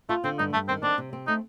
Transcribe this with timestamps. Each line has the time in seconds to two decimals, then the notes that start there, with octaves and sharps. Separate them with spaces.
0.09 A3 F4
0.24 D3 C4
0.38 G2 D#4
0.53 G2 A3
0.68 D#3 C4
0.83 C4 D4
0.98 C3
1.13 C4
1.27 A3 D#4